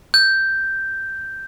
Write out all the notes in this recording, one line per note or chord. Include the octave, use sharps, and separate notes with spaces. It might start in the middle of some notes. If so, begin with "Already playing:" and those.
G6